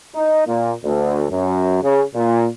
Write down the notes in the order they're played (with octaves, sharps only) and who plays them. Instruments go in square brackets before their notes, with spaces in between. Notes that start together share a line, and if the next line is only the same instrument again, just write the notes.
[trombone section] D#4
A#2
D2
F#2
C#3
A#2